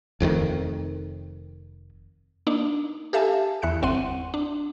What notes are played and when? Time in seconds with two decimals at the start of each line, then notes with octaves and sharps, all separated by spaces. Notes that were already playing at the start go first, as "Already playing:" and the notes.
0.20 F1 F2 A2 D#3
2.47 A#3 D4 D#4
3.13 G4 A4 E5 F5 G#5 A5
3.62 E2 E5 F#6 C#7
3.82 G1 C4 F#5 C6 D#7
4.34 D4